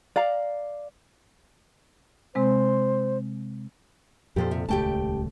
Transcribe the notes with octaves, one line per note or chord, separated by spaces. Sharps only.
D5 F5 A#5
C3 G#3 C4 C5
F2 A#2 F3 G4 A4 C5
C3
D#1 C#2 A3 G4 G5 A5